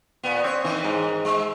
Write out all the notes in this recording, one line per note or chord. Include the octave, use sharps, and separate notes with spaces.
A#2 B3
C4 C#5
D#3 E3
G#2
G#3